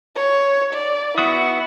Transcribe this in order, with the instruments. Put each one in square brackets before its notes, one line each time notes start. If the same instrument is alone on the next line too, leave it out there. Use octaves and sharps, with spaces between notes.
[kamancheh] C#5
D5
[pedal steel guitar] B3 F#4 D#6 [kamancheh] E4